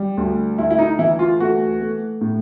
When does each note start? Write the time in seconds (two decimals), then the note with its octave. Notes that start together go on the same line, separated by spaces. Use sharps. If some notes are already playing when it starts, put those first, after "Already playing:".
Already playing: G3
0.17 D2
0.58 D2 E4
0.71 E4
0.79 D#4
0.99 E3 E4
1.19 F4
1.40 A3 F#4
1.81 A3
2.21 A2